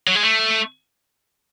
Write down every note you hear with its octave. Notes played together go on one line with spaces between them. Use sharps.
F#3
G#3
A3